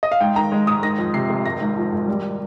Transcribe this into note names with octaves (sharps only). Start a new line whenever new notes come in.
D#5
F5
G#2 G5
D#3 A#5
G#3
G#2 D#6
D#3 A#6
F2
C3 C7
F1
G#1 A#6
G#2
F3
G#1
G3